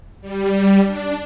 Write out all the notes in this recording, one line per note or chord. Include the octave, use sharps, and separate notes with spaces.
G3
D4